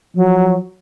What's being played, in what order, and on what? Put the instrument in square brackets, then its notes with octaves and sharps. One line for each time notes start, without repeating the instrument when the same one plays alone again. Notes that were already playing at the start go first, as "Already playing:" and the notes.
[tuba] F3 [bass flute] F#3